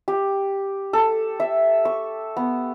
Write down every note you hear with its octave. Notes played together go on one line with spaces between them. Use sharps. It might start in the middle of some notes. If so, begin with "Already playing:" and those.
G4
A4
E5
C#6
B3